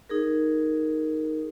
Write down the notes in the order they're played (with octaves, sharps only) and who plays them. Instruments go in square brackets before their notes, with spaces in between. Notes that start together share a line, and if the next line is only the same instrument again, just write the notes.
[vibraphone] D#4 G#4 A#4